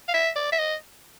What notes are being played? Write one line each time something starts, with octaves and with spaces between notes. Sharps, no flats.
F5
E5
D5
E5
D#5